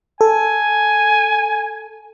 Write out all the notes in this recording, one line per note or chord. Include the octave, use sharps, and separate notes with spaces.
A4 G#5